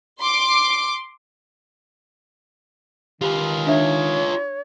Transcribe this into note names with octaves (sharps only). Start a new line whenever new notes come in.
C6 D6
D#3 F4 G4 B4
D4 C#5 E5